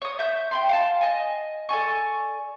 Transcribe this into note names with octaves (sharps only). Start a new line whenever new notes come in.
C#5 D#6
E5 G6
G5 B5 C6
F5 G5 A5
D#5 G#5
A4 D5 G#5 C#6